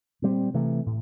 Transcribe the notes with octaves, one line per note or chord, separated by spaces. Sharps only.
A#2 G3 C4
C3 E3 A3
A2